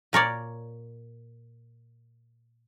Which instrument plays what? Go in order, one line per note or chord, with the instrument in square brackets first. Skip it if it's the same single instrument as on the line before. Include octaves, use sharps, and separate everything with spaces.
[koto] A#2 A#4 C#5 D5